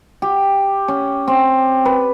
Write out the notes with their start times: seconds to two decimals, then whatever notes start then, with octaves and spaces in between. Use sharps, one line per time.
0.22 G4
0.88 C#4
1.28 C4
1.85 B4